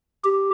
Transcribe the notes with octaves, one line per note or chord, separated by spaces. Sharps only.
G4